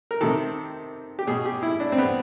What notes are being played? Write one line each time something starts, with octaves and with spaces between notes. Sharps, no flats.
A#4
C3 D#3 A4
G4
B2 G#4
G4
E4
D4
C4
B3